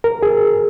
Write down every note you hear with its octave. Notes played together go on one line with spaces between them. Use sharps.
A#4
G#4